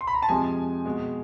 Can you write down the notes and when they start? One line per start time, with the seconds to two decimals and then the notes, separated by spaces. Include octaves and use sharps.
0.01 C6
0.07 B5
0.14 A#5
0.22 A5
0.29 F2 C3 F3 G#3 G#5
0.85 B2 G#3